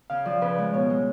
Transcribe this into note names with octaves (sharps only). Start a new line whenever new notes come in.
C#3 F5
F3 D5
C#3 B4
G#3
B2 C#5
G#3